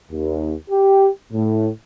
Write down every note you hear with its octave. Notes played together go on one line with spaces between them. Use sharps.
D#2
G4
A2